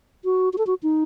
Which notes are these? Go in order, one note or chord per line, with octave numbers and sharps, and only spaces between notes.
F#4
F#4
A4
F#4
D#4